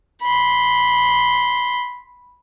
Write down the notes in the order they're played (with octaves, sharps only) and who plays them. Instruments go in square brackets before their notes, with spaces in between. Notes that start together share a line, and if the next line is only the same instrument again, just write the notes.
[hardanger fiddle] B5 C6